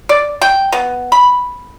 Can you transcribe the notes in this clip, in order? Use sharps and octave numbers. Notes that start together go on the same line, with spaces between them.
D5
G5
B3
B5